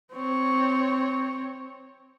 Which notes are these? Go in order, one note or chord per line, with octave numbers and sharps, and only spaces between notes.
C4 C#5